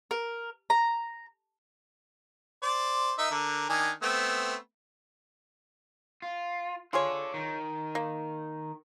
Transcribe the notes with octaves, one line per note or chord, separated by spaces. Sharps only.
A#4
A#5
C5 D5
D#4 A#4 E5
D3 A#4
D#3 D4 G#5
A3 B3 C4
F4
F4 G#4 A4 C#5 D5
D#3
A#3